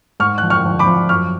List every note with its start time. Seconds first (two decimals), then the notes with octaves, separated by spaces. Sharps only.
0.20 G#2 C#6 F6
0.38 F3 F#6
0.50 C#6 F6
0.65 F3
0.79 B5 D6
0.86 F3
1.09 F#2 C#6 F6